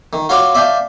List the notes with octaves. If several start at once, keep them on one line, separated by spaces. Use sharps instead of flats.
D#3
F4 F#4 C#5 F5 C6 D6
D5 E5 F5 G5 A5